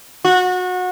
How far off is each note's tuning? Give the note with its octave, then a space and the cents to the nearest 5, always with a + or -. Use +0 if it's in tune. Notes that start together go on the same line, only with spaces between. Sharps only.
F#4 -25